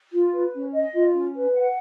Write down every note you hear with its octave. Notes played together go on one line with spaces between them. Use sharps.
F4
B4
C#4
D#5
F4
C#4
B4
F#5